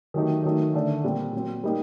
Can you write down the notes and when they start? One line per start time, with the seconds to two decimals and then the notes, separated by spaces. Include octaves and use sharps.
0.14 D#3 F#3 A3 D#4 G4
0.44 D#3 F#3 A3 D#4
0.74 D3 A3 D4
1.04 A#2 G3 C4
1.33 A#2 F#3 C4
1.64 G3 A#3 D#4 G4